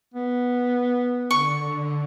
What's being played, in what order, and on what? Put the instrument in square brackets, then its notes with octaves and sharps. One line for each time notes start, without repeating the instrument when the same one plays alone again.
[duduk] B3
[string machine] D3 [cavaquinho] C#6